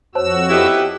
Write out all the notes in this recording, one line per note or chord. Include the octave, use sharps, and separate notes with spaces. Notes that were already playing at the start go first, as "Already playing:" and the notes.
F2 F#4 C5 C#5 A5 E6
B3 D#4 E4 G4